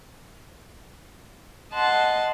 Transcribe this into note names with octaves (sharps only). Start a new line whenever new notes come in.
D#5 F#5 A5 C6